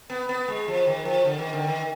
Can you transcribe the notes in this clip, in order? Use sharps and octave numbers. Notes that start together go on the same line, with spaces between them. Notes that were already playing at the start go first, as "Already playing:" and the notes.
B3
B3
G#3
F3
D#3
F3
D3
D#3
D3
D#3